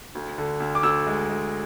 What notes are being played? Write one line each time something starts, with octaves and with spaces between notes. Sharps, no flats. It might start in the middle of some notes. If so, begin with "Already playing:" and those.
D2
D3
D2
D6
D2 E6
G#3
G#3